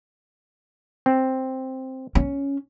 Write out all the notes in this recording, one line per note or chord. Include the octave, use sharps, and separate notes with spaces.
C4
C#4